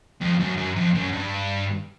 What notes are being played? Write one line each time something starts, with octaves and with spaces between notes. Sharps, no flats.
F2
F#2
F#2
F2
F#2
G2